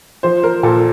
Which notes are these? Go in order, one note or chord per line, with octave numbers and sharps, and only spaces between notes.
F3 C5
A#4
A#2 A4